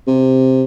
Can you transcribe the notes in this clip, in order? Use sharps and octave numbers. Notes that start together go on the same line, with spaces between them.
C3